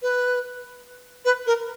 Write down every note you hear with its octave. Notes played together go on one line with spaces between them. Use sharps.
B4
B4
A#4